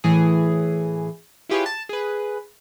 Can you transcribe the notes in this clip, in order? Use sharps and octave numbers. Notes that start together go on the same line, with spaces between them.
A2 E3 G#4
E4 F4 G4 G#4 B4 C#5
A5
G#4 B4